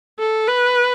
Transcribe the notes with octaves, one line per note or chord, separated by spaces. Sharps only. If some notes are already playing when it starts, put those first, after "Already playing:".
A4
B4